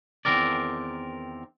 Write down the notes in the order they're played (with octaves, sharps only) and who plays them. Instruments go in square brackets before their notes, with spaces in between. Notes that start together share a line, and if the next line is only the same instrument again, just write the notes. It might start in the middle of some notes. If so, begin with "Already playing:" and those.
[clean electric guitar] E2 B2 D#3 C4 A#4 D5